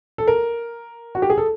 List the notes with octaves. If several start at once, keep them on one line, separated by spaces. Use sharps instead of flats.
A4
A#4
F#4
G4
G#4
A4